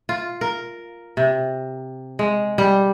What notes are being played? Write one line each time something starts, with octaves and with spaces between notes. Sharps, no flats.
F4
A#4
C3
G#3
G3